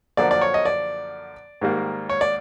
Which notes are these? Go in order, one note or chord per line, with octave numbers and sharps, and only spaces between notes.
F#2 D3 F3 A#3 D5
D5
C#5
D#5
D5
G#2 D#3 G3 A#3
C#5
D5